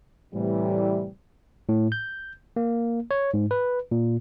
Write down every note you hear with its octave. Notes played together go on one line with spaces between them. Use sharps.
A2 C3 E3 G3
A2
G6
A#3
C#5
G#2
B4
A#2